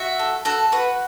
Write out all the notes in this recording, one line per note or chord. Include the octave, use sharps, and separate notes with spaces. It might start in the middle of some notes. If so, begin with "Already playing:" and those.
Already playing: F#4 E5
A4
F#4 A4
F#4 B4